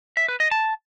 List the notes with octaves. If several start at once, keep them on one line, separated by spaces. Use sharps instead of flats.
E5
B4
D#5
A5